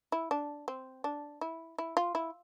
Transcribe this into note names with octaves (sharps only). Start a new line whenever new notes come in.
E4
D4
C4
D4
E4
E4
F4
E4